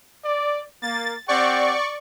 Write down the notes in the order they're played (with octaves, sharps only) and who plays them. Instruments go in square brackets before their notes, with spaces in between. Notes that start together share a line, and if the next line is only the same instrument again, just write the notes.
[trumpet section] D5
[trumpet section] A#3 [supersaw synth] A6
[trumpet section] C4 G4 F#5 [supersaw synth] D5 C#6